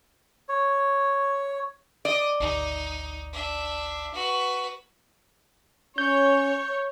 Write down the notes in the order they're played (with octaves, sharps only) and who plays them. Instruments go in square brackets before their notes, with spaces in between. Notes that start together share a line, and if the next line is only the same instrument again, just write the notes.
[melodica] C#5
[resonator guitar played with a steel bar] D5 [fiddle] D#5
[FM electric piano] G#1 D2 [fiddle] D#4
[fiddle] D4 E5
F#4 B4
[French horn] C#4 [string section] C#5 [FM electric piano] G6